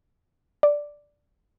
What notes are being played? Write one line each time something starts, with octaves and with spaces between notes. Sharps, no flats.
D5